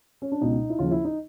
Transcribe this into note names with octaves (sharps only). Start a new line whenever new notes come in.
C#4
D4
C#2 B2 D#4
E4
D#2 C#3 F3 F4
E4
D#4